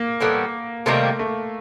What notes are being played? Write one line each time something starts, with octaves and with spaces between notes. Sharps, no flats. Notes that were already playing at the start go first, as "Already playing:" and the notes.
Already playing: A#3
A2 E3 G3 B3
C3 D#3 G3 A3 A#3
A3